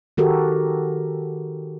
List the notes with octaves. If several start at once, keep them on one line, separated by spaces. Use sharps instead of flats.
D#3 F#4 G4 A4 A#4